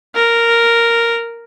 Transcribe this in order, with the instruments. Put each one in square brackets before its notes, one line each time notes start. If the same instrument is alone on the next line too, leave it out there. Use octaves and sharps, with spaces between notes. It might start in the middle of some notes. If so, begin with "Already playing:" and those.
[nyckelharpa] A#4